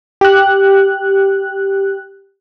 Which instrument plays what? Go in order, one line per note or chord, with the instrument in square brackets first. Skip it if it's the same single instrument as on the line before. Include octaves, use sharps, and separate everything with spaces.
[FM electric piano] G4 F#6